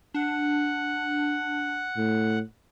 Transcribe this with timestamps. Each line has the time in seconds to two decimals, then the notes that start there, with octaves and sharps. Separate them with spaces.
0.14 D4 F#5
1.97 A2